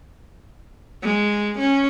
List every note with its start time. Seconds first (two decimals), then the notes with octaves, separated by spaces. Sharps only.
1.02 G#3
1.59 C#4